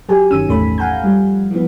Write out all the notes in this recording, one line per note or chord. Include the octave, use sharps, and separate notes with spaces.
F#3 G4 G#5
G1 D#3 C#4 E6 D#7
A1 E2 A3 C#4 B5
F5 F#5 G#5 A#5 G6
F3 G3
E3 F3 B3